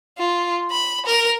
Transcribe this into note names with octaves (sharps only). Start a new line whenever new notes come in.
F4
B5
A#4